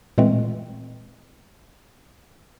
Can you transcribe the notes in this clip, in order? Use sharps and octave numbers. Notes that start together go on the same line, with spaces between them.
A#2 E3 G#3 A3 C4